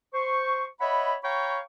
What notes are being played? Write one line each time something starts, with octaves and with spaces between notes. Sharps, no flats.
C5 C#6
C#5 D#5 E5 F#5 B5
C#5 F5 G5 A#5 B5 C#6